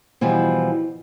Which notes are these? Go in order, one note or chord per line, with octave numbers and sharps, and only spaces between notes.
B2 E3 F3 G3